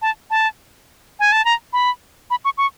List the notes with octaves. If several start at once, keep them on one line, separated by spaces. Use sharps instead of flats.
A5
A5
G#5
A5
A#5
B5
B5
C#6
C#6